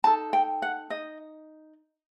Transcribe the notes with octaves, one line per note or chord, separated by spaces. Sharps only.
D#4 A4 A5
G5
F#5
D#4 D#5